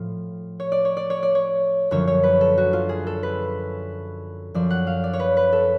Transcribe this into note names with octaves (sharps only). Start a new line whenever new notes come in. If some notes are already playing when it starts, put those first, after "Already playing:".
Already playing: A2 F3 F4
C#5
D5
C#5
D5
C#5
D5
C#5
F#2 D3 F3 C#5
C#5
B4
A4
F#4
F4
G#4
A4
B4
F#2 F3 D5
F#5
F5
D5
C#5
B4
B4
A4